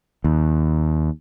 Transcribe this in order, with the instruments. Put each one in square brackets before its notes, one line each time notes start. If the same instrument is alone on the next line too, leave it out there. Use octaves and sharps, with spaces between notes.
[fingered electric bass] D#2